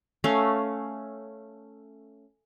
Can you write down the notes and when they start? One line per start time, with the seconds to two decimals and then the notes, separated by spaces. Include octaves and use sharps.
0.24 A3 C#4 F5